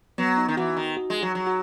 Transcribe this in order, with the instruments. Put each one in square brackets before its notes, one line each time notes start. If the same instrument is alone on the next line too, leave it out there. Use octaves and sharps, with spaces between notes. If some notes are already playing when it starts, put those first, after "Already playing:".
[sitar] F#3 [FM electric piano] B3
[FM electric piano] D#4
[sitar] D#3
[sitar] E3 [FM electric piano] F#4
[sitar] D#3
[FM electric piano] F#4
[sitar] G#3
[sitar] F#3 [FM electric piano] F#4
[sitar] F#3
[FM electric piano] F#4